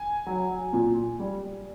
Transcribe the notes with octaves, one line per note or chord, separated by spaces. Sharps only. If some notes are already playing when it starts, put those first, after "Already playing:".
Already playing: G#5
F#3
A#2
G3